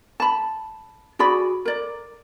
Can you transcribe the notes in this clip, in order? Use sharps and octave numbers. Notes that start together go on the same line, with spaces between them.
A5 B5
F#4 G#4 D5 B5
A#4 D5